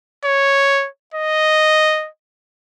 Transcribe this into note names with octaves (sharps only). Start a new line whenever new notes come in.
C#5
D#5